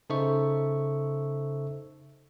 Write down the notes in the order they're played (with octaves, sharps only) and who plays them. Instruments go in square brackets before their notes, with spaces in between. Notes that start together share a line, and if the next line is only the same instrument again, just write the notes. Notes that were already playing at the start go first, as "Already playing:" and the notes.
[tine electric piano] C#3 D#4 A4 C5 E5 C#6